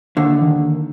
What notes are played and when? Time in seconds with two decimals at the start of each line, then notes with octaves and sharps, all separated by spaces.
0.17 D#2 D3
0.42 D#3